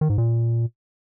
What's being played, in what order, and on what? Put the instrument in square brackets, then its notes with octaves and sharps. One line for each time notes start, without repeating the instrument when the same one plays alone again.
[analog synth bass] D#3
G#2
A#2